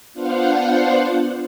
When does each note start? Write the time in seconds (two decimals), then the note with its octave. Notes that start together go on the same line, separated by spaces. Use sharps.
0.13 B3 D4 F4 C5 F5 F#5